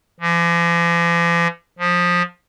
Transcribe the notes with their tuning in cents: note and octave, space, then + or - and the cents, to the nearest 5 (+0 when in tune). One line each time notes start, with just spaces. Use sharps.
F3 -45
F3 +20